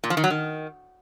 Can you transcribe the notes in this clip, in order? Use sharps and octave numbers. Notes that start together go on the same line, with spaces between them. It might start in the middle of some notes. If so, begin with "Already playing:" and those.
A#2
F3
D#3
F#3
D#3